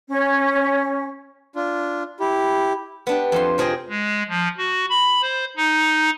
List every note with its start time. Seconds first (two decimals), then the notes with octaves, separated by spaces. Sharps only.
0.10 C#4
1.55 D4 F4
2.20 E4 G4
3.07 B3 D4 G4
3.32 F2 F3 C6
3.58 C3 F3 G#4 D#5 G5
3.89 G#3
4.29 F3
4.58 F#4
4.90 B5
5.22 C5
5.57 D#4